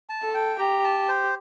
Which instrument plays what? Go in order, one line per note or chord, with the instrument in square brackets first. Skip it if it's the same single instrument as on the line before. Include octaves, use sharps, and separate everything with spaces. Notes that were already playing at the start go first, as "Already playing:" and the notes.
[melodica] A5
[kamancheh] A4
[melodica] G5
[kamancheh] G4 [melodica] A#5
[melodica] A5
C5